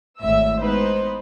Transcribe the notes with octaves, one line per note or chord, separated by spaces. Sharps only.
G#1 A2 E5 E6
G#3 B3 D#4 B4 C5